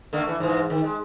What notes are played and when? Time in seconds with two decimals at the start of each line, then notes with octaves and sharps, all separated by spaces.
0.13 D3 A3 A#3
0.28 E3
0.40 G#2 E3
0.70 D#3
0.84 G#3